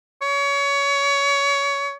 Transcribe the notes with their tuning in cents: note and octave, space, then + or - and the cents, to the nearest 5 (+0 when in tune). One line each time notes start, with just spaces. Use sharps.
C#5 +25